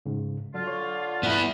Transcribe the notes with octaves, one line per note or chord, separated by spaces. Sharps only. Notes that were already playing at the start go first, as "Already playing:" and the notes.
G#2 C#3
D3 F#3 F4
C#5
G2 B3 E4